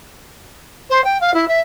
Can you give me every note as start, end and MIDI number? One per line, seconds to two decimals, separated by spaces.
0.89 1.03 72
1.04 1.17 79
1.20 1.33 77
1.33 1.47 64
1.47 1.59 76